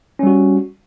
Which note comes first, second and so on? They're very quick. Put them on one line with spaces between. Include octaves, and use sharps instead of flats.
C#4 G3 F#4